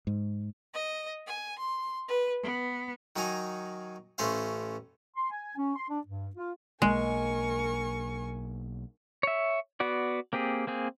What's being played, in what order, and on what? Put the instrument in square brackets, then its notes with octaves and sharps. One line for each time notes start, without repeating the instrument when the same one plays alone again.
[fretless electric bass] G#2
[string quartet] D#5
G#5
C6
B4
B3
[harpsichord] D#3 F#3 D#4 F#5 G#5 A#5
A1 A3 C#4 C5 F5
[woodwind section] C6
G#5
C#4
C6
D4
G2
F4
[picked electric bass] B1 A#3 [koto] G#3 [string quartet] A#4 G#5 C#6
[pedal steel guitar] C#5 E5
B3 F#4 D5
A#3 C4 G4 G#4
A#3 C4 G#4